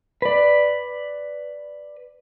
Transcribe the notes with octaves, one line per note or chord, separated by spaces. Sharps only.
B4 D5